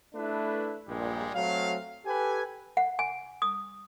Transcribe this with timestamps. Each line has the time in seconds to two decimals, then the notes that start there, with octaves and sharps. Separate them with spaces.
0.15 A3 D4 E4 B4
0.88 A#1 G2 A#2 G3 G#3
1.34 F#3 A3 C4 F5
2.06 G4 A4 B4 G#5
2.77 F#5
2.99 G#5
3.42 D#6